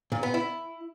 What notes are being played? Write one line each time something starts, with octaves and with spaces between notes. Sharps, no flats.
A#2
B3
E4